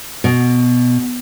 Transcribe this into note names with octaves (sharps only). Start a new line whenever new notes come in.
B2